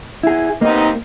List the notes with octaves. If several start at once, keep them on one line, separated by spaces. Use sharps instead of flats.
E4 G#4
C3 A#3 B3 D#4